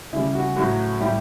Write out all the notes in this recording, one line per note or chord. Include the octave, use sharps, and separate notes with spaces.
C#3 G3 E4
F#4
A2 F#3 F#4
A2 G3 E4 G4